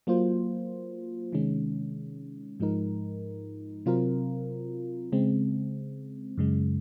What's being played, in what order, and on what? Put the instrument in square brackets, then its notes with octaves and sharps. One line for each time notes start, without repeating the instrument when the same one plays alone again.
[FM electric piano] F#3 A#3 F4 C5
C3 D#3 G#3 C#4
G#2 F3 G#3 D#4 A#4
C3 F#3 C4 F4 A#4
C#3 G#3 C4
F#2 C#3 G#3